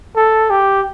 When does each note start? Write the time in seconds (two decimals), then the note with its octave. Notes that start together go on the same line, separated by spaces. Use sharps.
0.16 A4
0.50 G4